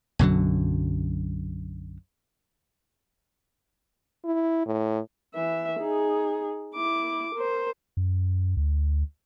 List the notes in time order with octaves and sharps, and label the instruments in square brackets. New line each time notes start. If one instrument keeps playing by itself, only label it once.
[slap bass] B1 F#2 D3 F#3
[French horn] E4
A2
[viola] E3 E5
D#4 G#4
E4 D6
A#4 C5
[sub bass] F#2
D2